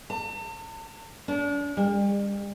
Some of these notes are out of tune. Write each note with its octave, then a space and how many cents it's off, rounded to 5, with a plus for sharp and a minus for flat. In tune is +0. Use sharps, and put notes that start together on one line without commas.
A5 +40
D4 -35
G3 +40